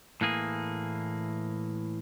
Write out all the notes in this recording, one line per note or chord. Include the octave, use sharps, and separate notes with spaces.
A2 E3 A#3 G#4